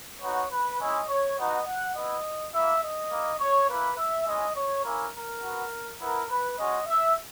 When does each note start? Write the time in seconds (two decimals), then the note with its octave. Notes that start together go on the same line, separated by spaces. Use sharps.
0.21 B3 D#4 F#4 C#5
0.51 B4
0.79 G#3 C#4 E4 D#5
1.09 C#5
1.37 B3 D#4 F#4 D#5
1.66 F#5
1.95 B3 E4 D#5
2.53 A#3 E4 E5
2.82 D#5
3.11 A#3 E4
3.40 C#5
3.68 A#3 E4 B4
3.98 E5
4.27 G#3 C#4 E4 D#5
4.56 C#5
4.85 A#3 C#4 E4 A#4
5.13 A#4
5.42 B3 F#4
6.00 B3 E4 A#4
6.29 B4
6.58 G#3 C#4 F#4 D#5
6.87 E5